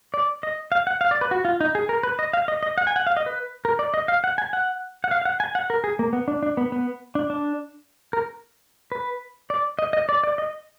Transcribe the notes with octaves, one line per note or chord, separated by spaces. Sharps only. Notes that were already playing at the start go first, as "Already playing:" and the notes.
D5
D#5
F5
F#5
F5
D5
B4
F#4
F4
D#4
G#4
A#4
B4
D#5
F5
D#5
D#5
F#5
G#5
F#5
F5
D#5
B4
A#4
D5
D#5
F5
F#5
G#5
F#5
F#5
F5
F5
F#5
G#5
F#5
A#4
G#4
A#3
B3
D4
D4
B3
B3
D4
D4
A#4
B4
D5
D#5
D#5
D5
D5
D#5